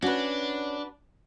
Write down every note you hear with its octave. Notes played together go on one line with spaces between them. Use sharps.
C#4 D4 F#4 B4